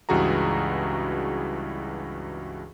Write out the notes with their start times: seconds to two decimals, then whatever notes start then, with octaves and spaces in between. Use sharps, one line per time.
0.09 C#2 G2 E3 F#4 G#4 A#5